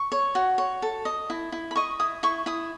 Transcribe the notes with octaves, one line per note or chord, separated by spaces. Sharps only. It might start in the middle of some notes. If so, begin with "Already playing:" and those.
Already playing: C#6
C#5
F#4
C#5
A4
D#5
E4
E4
B5
D#5 C#6
E4 D#6
E4 C#6
E4 D#6